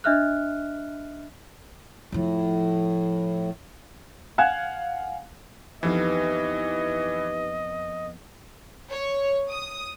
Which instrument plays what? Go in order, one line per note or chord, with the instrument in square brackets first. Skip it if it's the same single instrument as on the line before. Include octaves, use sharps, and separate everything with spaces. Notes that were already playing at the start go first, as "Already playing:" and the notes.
[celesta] D4 D#5 E5 F6 F#6
[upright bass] F2 F3 [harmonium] A2
[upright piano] F5 F#5 G#5 F#6 G#6 E7
[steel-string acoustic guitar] F2 B3 F5 [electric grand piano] E3 [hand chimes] D#4 G4 B4 [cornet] D#5
[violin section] C#5
D#6